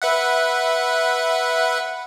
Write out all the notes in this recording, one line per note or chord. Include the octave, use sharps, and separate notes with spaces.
B4 E5 F#5